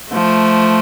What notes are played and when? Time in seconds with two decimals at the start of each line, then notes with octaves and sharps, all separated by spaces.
0.12 F3 A3